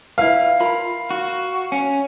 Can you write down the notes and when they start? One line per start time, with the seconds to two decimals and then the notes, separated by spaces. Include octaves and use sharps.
0.18 E4 B4 F5
0.60 F4 A#4 B5
1.11 F#4
1.72 C#4